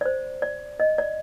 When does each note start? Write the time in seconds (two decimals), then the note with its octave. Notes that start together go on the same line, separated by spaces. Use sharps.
0.01 D5
0.05 C5
0.42 D5
0.80 D#5
0.98 D5